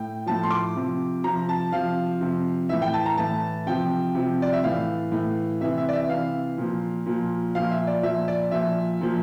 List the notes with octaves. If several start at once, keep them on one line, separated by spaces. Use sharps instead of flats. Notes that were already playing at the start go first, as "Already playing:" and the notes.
Already playing: A2 G5
A2 F3 A5
C6
D6
C3 F3
C3 F3 A#5
A5
C3 F3 F5
C3 F3
A2 E3 E5
G5
A5
A#5
A2 E3 A5
C3 F3 G5
C3 F3
D5
E5
A2 E3 F5
A2 E3
C3 E3 E5
E5
D5
E5
C3 E3 F5
A#2 F3
A#2 F3
A#2 F3 F5
E5
D5
A#2 F3 E5
D5
A#2 F3 E5
A#2 F3